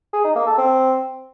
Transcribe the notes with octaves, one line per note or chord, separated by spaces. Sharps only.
G#4
D#4
A#3
A4
C4